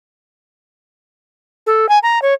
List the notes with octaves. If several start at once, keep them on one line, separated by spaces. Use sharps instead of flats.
A4
G#5
A#5
C#5